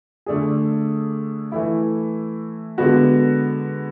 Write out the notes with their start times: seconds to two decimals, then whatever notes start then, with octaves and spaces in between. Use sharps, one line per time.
0.26 D3 A3 D4 G#4
1.52 E3 A3 E4
2.78 D3 G#3 B3 F#4